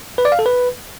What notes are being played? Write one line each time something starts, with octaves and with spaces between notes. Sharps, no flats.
B4
D5
F5
A4
B4